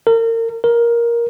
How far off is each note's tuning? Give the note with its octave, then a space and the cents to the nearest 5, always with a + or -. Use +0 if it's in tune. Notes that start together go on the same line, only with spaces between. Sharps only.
A#4 -35
A#4 +10